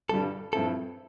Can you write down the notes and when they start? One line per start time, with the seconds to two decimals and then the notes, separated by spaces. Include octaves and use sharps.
0.09 G1 G2 D3 G3 A4
0.53 G2 F3 C4 E4 A4